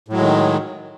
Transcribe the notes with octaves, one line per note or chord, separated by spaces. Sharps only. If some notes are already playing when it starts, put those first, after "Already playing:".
A2 D#3 F#3 G#3